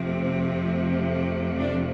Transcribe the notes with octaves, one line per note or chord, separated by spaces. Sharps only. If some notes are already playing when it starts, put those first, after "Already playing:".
Already playing: F2 C3 F3 A3 C4
C4
D4